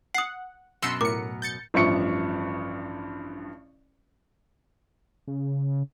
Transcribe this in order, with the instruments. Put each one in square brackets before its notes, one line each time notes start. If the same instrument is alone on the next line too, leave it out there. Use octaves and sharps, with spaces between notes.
[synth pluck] F#5 [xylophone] D#6 C7
[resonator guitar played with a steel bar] F#2 B2 [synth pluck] C6 E6 C#7
[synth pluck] A2 C#7 [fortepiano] A#4 [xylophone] D6
[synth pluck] G6 A6 C#7
[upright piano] A1 G2 F3 E5 C#6 C#7
[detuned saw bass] C#3